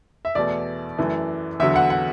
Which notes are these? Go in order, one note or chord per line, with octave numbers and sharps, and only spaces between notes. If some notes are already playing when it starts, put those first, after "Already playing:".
E5
E2 B2 A3 D5
F#2 E3 A3
E2 D3 F#3 E5
F#5
F#5